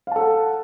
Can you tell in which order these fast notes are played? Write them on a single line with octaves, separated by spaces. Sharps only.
F5 A5 A4 F#5